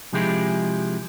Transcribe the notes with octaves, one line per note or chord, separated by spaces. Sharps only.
C3 F3 G#3 E4 G4 G#4